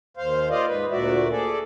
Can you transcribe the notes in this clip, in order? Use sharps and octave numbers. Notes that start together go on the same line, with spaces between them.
D#2 C5 F5
F4 C5 D5 D#5 F5
G#2 B4
D2 A#2 F#4 D5 E5
G#4 A4 D5